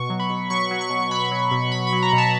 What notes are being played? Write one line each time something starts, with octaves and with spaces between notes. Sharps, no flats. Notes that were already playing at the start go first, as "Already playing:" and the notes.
Already playing: B2 C#6
F#3
B5
B2
F#3 C#6
F#3
C#6
B2
F#3 B5
F#3
B2
B2 B5
B5
F#3
A#5
B2
A5